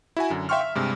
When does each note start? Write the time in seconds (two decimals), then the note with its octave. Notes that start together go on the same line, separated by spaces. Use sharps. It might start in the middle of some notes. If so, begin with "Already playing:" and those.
0.17 E4 F#4 G#5
0.30 F#2 D3
0.49 E5 F5 G5 C6 C#6 F6
0.61 E5
0.75 G2 C3 G#3